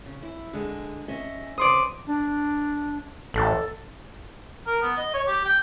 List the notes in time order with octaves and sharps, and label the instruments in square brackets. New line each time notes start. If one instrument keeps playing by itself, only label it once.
[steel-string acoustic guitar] C#3
E4
D3 G#3
C#4 D#5 E5
[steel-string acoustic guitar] C#3 B4 C5 [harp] D5 C6 D#6
[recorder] D4
[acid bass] A1 [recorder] A4
[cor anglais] A#4
B3
D#5
C#5
G4
G5